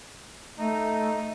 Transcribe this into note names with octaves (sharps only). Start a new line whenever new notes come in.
A3 D#4